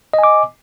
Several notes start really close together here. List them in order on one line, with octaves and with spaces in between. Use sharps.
D#5 G#5 D6